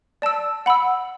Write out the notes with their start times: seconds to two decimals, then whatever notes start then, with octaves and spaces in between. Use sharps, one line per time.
0.22 D5 A5 E6
0.66 F#5 B5 E6